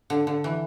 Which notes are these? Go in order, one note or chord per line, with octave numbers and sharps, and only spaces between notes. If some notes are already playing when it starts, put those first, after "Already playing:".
D3
D3
E3